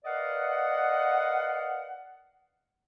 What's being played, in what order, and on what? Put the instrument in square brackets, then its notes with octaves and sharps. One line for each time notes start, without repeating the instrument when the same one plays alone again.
[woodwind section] A#4 B4 D5 D#5 F5 F#5